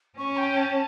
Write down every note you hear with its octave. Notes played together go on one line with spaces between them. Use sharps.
C#4 C#6
G5
A5